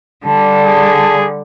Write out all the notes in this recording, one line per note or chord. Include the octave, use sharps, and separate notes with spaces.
D3 G3 A5
G#4